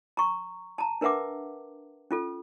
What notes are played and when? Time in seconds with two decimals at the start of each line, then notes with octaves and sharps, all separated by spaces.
0.17 A#5 C#6
0.78 A5 A#5
1.01 D4 A#4 B4 E5 F#5 D6
2.11 C#4 F4 A4